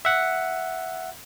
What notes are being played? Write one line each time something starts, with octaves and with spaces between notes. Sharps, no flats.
E5 F#5